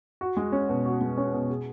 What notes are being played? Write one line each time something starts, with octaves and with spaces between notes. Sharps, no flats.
F#4
G#3
C#4
B2
F#4
G#3
C#4
B2
G#4